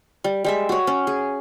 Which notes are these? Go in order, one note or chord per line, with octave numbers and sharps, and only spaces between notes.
G3
G3 G#3 E5
F#4 C#5
C#4
G#4